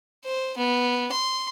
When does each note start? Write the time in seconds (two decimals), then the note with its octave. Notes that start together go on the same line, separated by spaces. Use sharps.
0.24 C5
0.57 B3
1.12 C6